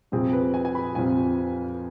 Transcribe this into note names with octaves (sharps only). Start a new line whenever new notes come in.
F2 C3 F3 C4 G#4
B4
G#5
G#5
B5
F2 C3 F3 C4 G#5